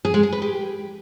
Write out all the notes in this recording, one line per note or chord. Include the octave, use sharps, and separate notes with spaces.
G#4
G#3
G#4
B4
G4